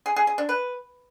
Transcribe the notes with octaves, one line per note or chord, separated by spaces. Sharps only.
G#4
G#4
G#4
D4
B4